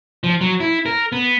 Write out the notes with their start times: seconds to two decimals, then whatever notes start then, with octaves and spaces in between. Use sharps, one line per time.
0.24 F3
0.41 F#3
0.60 E4
0.86 A#4
1.12 B3